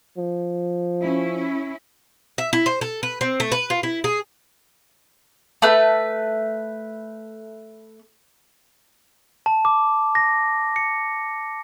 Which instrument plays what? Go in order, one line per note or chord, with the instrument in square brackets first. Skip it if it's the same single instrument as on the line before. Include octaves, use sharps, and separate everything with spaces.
[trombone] F3
[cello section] C#4 E4
[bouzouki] E5
E4
C5
A4
B4
C4
A3
B4
F4
E4
G#4
[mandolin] A3 B4
[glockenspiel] A5
D6
A#6
C#7